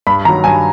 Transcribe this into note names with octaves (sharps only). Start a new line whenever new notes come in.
G2 B5
D#3 F#3 A#5
G2 G#5